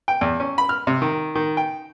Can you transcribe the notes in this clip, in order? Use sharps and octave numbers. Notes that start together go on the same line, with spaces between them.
G5
E2
C#4
B5
F6
C3
D#3
D#3
G5